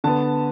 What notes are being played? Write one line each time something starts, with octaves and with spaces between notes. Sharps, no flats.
D3 B3 A5